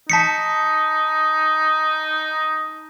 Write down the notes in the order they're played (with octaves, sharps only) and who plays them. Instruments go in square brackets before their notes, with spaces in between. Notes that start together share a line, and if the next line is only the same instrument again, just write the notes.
[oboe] D#4 [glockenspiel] A5 B6 C#7